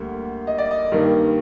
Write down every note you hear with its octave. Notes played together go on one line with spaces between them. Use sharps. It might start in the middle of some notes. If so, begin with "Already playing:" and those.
Already playing: D2 D3 G3 A#3
D#5
D5
D#5
G2 D#3 G3 A#3